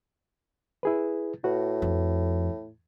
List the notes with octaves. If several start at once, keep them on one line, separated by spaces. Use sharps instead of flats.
E4 G#4 B4
A2 F#4 B4
F2